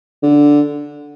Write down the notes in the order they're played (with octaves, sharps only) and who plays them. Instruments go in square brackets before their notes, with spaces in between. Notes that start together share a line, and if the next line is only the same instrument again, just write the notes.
[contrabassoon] D3